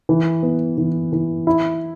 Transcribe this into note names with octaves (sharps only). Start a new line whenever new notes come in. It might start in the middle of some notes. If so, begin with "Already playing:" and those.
E3
B3
E3
E3
E4